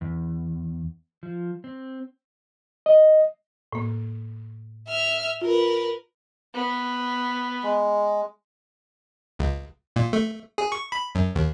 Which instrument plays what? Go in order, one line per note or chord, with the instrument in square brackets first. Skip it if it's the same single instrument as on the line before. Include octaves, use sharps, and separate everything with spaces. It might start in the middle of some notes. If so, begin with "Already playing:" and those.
[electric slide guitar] E2
F3
C4
[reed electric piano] D#5
[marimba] A2 A#3
[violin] E5 F6
[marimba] F4 [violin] A#4 B4
[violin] B3
[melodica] G#3
[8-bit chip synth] C#2
A#2
A3
G#4
C#6
B5
F#2
D#2